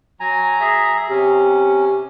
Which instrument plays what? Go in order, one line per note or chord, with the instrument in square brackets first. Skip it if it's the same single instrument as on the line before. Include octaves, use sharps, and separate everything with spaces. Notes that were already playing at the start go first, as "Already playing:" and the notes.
[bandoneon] F#3 G#5 A#5
G#4 E5 A#5
[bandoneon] C3 C#4 [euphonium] G4